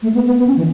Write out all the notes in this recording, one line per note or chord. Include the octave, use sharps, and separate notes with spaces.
A3
B3
B3
B3
C#4
E3